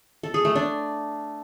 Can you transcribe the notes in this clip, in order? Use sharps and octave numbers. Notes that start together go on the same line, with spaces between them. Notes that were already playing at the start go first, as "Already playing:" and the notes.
A4
G#4
A3
D4